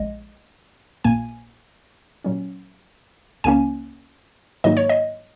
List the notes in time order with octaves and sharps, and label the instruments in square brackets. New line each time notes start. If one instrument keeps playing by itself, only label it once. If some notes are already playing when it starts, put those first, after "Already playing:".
Already playing: [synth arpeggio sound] A#1 G#3 D#5
A#1 A#2 A#3 G#5
A#2 F#3 C#4
C#2 C#3 A#3 C#4 G#5
G#2 D#3 F#3 A#3 D#4 D#5
C#5
D#5